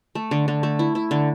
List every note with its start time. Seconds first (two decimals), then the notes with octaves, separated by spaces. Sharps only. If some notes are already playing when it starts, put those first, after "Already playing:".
0.15 A3
0.31 D3
0.48 D3
0.63 A3
0.79 E4
0.95 E4
1.11 D3